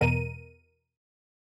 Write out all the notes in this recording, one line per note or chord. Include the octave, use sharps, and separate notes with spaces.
E2 B2 A#4 D#7